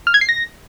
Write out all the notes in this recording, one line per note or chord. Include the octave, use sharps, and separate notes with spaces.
F6
G#6
C7
A#6